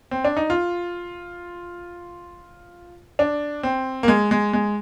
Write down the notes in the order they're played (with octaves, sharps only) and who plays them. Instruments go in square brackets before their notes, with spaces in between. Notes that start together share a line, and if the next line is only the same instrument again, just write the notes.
[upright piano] C4
D4
D#4
F4
D4
C4
A#3
G#3
G#3
G#3